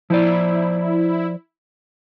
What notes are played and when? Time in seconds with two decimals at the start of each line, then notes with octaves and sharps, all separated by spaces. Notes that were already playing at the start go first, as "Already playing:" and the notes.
0.10 F3 E4 C5 D5